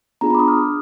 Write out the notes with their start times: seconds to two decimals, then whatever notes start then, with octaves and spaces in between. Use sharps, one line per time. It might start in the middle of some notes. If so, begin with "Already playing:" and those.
0.21 B3 D4 F4 G#4 A#5
0.30 B5
0.34 D6
0.39 D#6
0.48 F6
0.57 D4 G#4